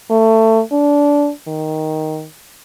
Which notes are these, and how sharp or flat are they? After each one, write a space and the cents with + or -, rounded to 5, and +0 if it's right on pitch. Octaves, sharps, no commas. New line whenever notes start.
A3 +20
D4 -20
D#3 +5